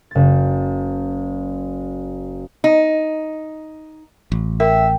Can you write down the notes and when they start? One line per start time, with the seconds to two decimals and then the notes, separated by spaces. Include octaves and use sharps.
0.11 F#1 A6
2.64 D#4
4.32 A1
4.60 A#4 E5 G5